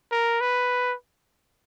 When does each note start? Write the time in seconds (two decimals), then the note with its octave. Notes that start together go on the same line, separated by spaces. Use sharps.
0.11 A#4
0.41 B4